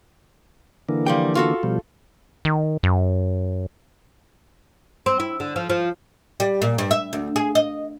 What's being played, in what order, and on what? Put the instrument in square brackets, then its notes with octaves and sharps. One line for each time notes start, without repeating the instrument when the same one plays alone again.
[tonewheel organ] D3 E3 A#3
[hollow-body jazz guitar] F3 G3 G5
F4 F#4 A4
[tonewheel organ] B2 F3 G3
[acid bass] D#3
F#2
[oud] C4
E4
D3
F3
F3
G3
A#2
G2
E5
D2
G#4
D#5